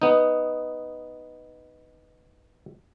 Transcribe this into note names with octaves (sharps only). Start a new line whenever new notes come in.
B3 D#4